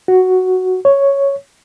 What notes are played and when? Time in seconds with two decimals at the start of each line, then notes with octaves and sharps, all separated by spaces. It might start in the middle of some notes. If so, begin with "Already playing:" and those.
0.08 F#4
0.85 C#5